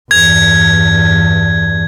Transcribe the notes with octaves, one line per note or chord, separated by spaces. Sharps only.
E2 G2 G#6